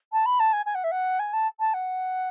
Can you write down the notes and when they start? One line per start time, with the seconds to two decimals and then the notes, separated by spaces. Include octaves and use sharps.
0.13 A5
0.26 B5
0.40 A5
0.53 G#5
0.66 G#5
0.75 F#5
0.84 E5
0.91 F#5
1.19 G#5
1.33 A5
1.60 A5
1.74 F#5